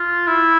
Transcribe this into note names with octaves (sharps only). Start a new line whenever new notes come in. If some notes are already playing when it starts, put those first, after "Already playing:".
Already playing: F4
E4